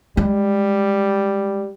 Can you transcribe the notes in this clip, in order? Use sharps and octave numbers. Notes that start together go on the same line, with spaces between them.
G3 G#3